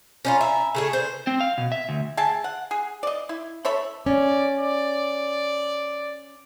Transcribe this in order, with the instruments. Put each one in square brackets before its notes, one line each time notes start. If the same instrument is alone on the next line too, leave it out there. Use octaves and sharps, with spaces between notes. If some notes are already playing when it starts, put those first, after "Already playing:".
[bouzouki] C#4 D#4 F4 [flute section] G#5 A#5 B5
[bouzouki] E5
C#3 A3 G#4
[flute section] B4 D5 [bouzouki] C5
[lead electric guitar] C4
F5
B2
E5
D2
[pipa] G#4 E5 G5 A5
F#5
G#4
D5 D#5
E4
A4 C#5 E5 B5
[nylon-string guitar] C#4 [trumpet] D5
[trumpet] D5